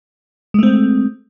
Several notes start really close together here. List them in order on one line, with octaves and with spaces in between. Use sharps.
G#3 A3 C4